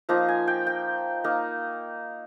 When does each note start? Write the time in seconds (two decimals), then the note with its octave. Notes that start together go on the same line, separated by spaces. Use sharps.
0.09 F3 A#3 D#4 A#5
0.28 G#5
0.48 G5
0.67 G5
1.24 A#3 D#4